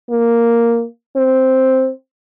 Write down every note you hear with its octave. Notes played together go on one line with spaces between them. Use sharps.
A#3
C4